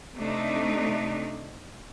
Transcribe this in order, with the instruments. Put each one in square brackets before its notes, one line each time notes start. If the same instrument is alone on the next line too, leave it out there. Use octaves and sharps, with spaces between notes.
[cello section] C3 A3 D4 D#4